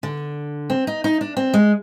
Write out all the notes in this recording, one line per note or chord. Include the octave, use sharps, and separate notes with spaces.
D3
C4
D#4
D#4
D4
C4
G#3